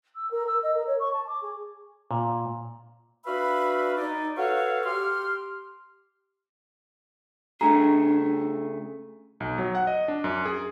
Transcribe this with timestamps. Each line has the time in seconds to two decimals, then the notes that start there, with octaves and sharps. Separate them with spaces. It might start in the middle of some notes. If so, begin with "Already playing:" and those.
0.16 E6
0.31 A#4
0.47 E6
0.63 D#5
0.74 A#4
0.87 C#5
1.00 C#6
1.13 A5
1.27 D6
1.42 G#4
2.11 A#2
3.25 D4 F#4 B4 E5 F5 B5
3.96 D#4 D5
4.36 F#4 A4 B4 C#5 F5
4.84 G4 C6 F6
7.61 C#3 A3 D4 G#4 A#5
9.40 B1
9.58 F#3
9.75 F#5
9.87 D#5
10.08 D4
10.24 F#2
10.45 G#4